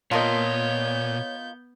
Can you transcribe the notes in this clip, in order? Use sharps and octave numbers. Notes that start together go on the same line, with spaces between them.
A#2 B3 F4 A#4 C#5 D#5 A5 G6